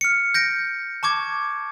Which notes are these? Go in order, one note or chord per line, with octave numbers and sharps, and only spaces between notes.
F6 C#7
G6 A#6 D7
A5 C#6 D6 G#6